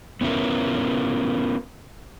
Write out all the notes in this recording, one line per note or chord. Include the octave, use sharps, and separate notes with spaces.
B3 C#4 E4 F4 A#4